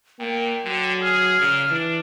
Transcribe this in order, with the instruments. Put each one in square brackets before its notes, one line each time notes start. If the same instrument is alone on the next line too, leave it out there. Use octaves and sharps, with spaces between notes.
[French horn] A#2 [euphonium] A#3 [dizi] G5
[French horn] D3 [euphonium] F#3
[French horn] G#4 [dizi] F6
[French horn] A#2 [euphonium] C#3
[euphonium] E3 [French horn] D4